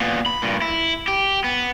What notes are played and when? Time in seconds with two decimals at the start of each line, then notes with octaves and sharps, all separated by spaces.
0.01 A#2 B3
0.26 B5
0.42 G2 A#2
0.62 E4
1.08 G4
1.44 B3